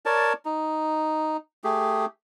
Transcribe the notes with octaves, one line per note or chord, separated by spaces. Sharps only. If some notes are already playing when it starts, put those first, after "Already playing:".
A#4 C#5 D5 A5
D#4
A3 G4 G#4